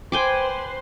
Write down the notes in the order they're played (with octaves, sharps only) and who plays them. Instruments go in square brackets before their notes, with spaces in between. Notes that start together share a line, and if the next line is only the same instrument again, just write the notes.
[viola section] B4 C5 C6 [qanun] G5 G#5 D6